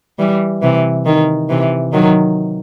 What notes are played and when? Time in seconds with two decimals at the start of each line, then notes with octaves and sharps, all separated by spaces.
0.19 E3 G3
0.62 C3 E3
1.06 D#3
1.49 C3 E3
1.93 D#3 F#3